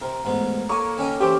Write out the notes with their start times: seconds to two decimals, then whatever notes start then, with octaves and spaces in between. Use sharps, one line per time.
0.01 C3 A#4
0.25 A1 G#2 B3
0.69 A#3 A4 C#5 G#5 C#6
0.98 D#3 C#4 A#4 G#5
1.20 E3 C4 G4 D6